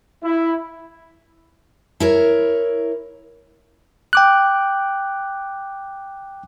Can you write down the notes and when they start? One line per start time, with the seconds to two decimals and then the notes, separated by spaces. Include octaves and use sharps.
0.23 E4
2.00 E4 A#4 C#5
4.13 G5 D6 F#6